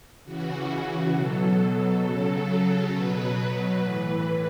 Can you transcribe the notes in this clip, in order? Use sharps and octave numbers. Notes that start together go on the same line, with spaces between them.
C#3 E3 F#4
B2 F#3 A4
C#3 F#3
B2 F#3 B4
A2 E3